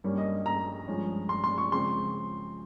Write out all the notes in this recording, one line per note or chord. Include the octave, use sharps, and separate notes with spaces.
G2 G3 A#3 C#4
D#5
A#5
G2 F3 G#3 C#4
C6
C6
C#6
C#3 F3 G#3 C4 C6